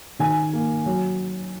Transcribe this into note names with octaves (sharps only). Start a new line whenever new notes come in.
D#3 G#5
A#3
F#3